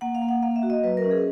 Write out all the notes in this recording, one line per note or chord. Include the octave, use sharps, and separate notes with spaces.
A#3 F#5
F5
A#3
F#5
A#3 F5
E5
F#4
D#5
F#3 B4
A#4
C#4
G#4